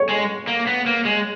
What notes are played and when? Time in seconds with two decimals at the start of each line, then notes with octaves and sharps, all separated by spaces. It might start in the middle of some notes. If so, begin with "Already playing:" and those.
Already playing: C#5
0.09 G#3
0.47 A#3
0.67 B3
0.86 A#3
1.05 G#3